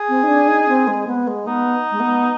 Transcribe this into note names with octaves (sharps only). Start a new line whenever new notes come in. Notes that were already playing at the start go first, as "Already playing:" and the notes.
Already playing: G#4
C4
D#4
D4
D#4
C4
G#3
B3
G#3
B3 D#4
G#3
B3